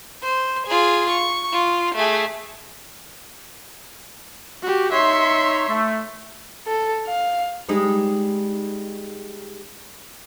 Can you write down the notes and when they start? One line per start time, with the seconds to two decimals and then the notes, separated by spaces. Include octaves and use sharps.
0.23 C5
0.67 F4 G#4
1.10 C#6
1.53 F4
1.95 A3 G#4
4.62 F#4 G4
4.92 D#4 C#5 E5 C6
5.69 A3
6.67 A4
7.07 F5
7.69 G3 G#3 D#4